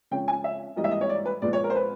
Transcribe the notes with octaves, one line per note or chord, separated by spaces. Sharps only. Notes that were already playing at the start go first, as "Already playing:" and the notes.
C#3 F3 G#3 C#4 G5
G#5
E5
G#2 E3 G3 A#3 D#5
E5
D#5
C#5
D5
B4
A#2 F3 G#3 B3 D5
C#5
A#4
C5
B4